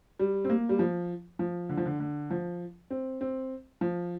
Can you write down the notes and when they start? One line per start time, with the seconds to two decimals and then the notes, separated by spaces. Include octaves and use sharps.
0.19 G3
0.44 C4
0.50 A#3
0.69 G3
0.79 F3
1.39 F3
1.69 D3
1.77 F3
1.86 D3
2.00 D3
2.30 F3
2.90 C4
3.21 C4
3.81 F3